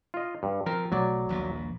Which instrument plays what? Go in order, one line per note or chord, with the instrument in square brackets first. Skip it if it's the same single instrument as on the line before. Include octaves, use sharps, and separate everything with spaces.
[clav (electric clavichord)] F4 D#5
G2
[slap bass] F3 [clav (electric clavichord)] C4 A#4
[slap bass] B1 A3 [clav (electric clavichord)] F#3 D5
[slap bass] D#1 A#1 A#2